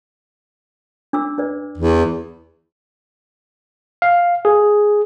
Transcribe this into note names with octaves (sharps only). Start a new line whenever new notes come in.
D4 D6 E6
D4 B4 D5
E2
F5
G#4